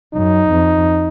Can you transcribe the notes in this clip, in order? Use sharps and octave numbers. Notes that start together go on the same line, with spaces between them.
F#2 D#4
F2